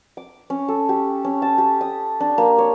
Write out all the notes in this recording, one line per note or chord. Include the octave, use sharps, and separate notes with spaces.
D6
C#4
A4
G4
C#4
A5
G4
D#6
D4
A#3
C#5